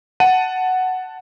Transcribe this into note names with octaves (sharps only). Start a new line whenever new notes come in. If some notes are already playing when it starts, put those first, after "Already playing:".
F#5 A5 D#7